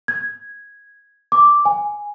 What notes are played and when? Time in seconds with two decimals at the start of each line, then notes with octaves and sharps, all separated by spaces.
0.08 G#6
1.32 D6
1.65 G#5